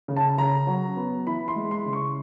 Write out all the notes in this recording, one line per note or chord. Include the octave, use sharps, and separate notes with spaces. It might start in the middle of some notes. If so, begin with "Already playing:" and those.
C#3
A5
C#3 A#5
F#3
B3
E3 B5
C6
G#3
C6
C#3
C#6